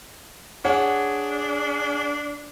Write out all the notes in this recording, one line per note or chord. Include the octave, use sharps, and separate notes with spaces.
D4 G#4 C#5 F#5